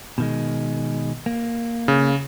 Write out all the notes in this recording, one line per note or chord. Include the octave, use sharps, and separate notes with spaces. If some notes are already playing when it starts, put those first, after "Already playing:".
B2 D#3 G#3
A#3
C#3